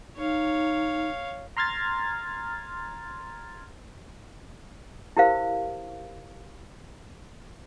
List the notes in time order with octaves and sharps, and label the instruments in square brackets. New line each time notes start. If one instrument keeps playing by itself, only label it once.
[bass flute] D#4 [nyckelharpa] C#5 F5
[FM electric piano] A#5 C6 F6 G#6 A6
[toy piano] E4 G4 A#4 C5 F5